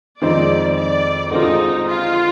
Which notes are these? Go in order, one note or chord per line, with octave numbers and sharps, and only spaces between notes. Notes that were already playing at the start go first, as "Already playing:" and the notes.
F2 D#3 G#3 C4 D#4 D5
D5
D3 G#3 C4 D#4 F4
F4